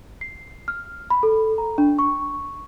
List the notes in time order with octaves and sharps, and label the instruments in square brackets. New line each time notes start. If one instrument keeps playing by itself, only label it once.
[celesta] C7
F6
B5
A4
A#5
D4
C#6